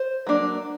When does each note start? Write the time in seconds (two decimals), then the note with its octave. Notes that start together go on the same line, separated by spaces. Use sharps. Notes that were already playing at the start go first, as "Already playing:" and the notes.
Already playing: C5
0.27 F#3 A#3 D4